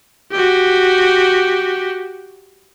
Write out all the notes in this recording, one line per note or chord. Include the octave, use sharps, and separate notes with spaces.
F#4 G4